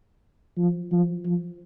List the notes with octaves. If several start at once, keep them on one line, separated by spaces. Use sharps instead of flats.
F3
F3
F3